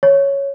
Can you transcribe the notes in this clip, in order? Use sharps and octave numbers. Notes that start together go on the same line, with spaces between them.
C#5